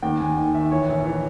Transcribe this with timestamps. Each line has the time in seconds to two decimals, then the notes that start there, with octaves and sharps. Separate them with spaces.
0.02 D#2 G5
0.19 D#2 G#5
0.37 D#3 G5
0.54 D#3 E5
0.71 E3 C#5
0.89 A#1
1.05 E3 C#5